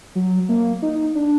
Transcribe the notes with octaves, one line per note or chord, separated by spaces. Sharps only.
F#3
A#3
D#4
D4